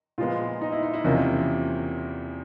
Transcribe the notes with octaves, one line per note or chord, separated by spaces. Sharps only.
A#2 F3 G#3 B3 F4
D#4
E4
D#4
E4
E2 C3 F3 A#3 C#4